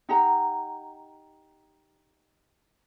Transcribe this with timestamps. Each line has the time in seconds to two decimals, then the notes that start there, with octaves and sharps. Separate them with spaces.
0.09 D#4 G4 F#5 A#5